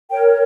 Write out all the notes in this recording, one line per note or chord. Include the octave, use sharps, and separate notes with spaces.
A#4 C#5 G5